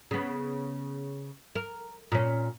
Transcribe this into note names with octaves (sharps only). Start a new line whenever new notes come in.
C#3 B3
A#4
A#2 C#4